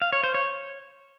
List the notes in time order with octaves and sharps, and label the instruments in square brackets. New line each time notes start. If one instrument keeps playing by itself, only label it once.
[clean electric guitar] F5
C#5
C5
C#5